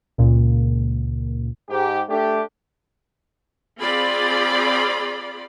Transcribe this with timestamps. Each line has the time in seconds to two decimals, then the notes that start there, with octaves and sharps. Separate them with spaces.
0.18 C#2 A#2
1.70 G#2 G4
2.09 A3 D4 G4
3.79 C4 F4 G#4 D5 B5